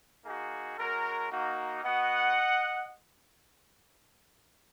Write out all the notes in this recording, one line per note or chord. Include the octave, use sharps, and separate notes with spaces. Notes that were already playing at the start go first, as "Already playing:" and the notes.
A#3 D#4 F#4 G#4
G#3 C#4 F#4 A#4
A#3 D#4 F#4
B3 F#4 D#5 F#5